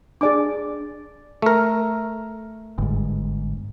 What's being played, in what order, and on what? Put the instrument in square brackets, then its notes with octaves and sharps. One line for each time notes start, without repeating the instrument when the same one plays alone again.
[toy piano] D4 [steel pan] G#4 D5 D6
[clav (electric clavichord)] A3 A#4
[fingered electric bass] G1 G#2